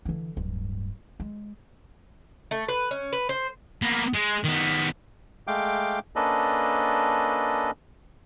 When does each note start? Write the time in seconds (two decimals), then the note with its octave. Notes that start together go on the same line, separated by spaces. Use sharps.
0.05 D3 E3
0.37 D1 G2
1.20 G#3
2.51 A3
2.68 B4
2.91 C#4
3.13 B4
3.29 C5
3.82 A#3 B3
4.14 G#3
4.44 D#3 B3
5.47 G#3 A3 F5 G5 D6
6.16 A#3 C#4 D4 A4 B4 D#5